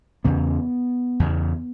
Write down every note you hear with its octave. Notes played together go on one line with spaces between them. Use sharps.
E2 C#3 B3
E2 C#3